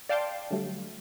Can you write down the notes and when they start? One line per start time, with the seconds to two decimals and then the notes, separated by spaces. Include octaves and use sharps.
0.09 D5 F5 G5 A5 C6 D6
0.50 D3 F#3 G3 A3